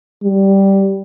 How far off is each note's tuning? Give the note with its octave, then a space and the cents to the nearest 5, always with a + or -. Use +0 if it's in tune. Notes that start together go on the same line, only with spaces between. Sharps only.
G3 -5